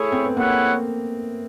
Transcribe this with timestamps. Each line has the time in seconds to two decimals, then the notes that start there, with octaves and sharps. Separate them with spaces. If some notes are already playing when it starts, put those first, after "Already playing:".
Already playing: A3 E4 G#4 C#5
0.12 C4
0.24 B3
0.36 A#3 E4 G#4 C#5 F#5